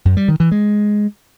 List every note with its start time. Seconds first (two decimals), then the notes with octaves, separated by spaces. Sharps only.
0.05 F#2
0.17 G3
0.28 D#3
0.40 E3
0.52 G#3